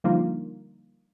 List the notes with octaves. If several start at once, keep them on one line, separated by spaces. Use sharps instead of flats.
D3 F3 G3 A#3 D#4 F4